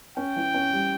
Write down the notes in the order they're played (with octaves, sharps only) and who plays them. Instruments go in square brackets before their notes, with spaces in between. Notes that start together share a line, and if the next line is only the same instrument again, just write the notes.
[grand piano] C#4 [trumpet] G5
[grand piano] E3
C#4
G3